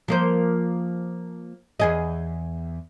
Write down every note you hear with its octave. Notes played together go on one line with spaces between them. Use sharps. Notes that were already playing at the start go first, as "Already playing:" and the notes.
F3 A#3 C5
E2 G#4 D#5